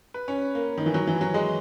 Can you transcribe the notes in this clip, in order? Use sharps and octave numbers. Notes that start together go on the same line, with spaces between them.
B4
C#4
A#3
D#3
E3
F#3
E3
F#3
G#3